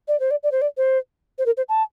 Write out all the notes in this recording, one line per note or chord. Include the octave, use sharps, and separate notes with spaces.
D5
C5
D5
D5
C5
D5
C5
C5
A#4
C5
A5